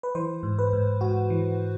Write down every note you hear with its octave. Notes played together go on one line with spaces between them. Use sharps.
B4
E3 C5
G#2
B4
G#2
G#2 F#4
E3